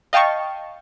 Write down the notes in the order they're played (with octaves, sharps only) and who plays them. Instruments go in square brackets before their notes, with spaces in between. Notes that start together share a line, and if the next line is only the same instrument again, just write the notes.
[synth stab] D#5 F5 G5 A5 C#6